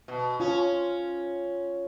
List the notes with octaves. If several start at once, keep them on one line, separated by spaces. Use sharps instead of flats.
B2
C#4 F4 C#5